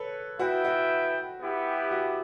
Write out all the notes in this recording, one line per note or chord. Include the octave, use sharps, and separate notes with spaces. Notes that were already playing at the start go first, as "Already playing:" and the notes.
Already playing: A4 B4 C#5
B3 E4 F#4 B4 E5 G5
F#4
B3 E4 G4
F#4